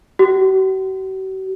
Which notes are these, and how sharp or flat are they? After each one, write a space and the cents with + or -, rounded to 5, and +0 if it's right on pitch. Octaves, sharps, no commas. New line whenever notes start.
F#4 +45